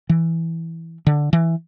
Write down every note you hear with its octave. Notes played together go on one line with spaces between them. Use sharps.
E3
D3
E3